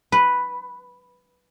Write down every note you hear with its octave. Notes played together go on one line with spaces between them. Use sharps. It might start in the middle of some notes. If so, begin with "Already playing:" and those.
B4